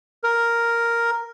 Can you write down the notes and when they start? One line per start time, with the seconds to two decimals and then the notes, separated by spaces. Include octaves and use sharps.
0.24 A#4